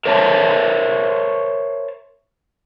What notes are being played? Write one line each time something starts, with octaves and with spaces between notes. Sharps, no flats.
A#4 C5 C#5 E5 A5